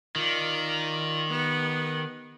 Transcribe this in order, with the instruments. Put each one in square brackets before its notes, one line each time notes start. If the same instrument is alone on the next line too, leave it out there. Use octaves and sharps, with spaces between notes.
[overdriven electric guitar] D#3 [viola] F4 D5
[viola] B3 G4